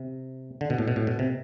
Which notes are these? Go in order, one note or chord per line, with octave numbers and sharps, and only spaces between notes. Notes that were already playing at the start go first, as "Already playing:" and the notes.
Already playing: C3
D3
B2
A2
B2
A2
B2
C3